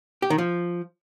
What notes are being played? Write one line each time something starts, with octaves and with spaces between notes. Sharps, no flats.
G4
D#3
F3